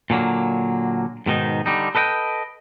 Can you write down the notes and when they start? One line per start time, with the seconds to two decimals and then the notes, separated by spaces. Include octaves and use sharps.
0.10 A#2 D3 F#3 A#3
1.26 G#2 B2 D#3 D#4
1.66 D3 G3 D#4
1.95 A4 B4 D#5 F#5 G5